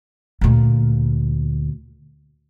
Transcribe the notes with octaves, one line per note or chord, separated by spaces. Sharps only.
D2 A#2